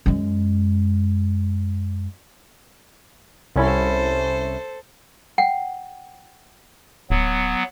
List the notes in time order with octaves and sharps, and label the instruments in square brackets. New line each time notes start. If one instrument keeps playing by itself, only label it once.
[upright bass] F#2 G#3
[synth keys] C2 C#4 E4 [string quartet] A4 C5
[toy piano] F#5 G5
[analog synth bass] D1 [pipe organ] F#3 B3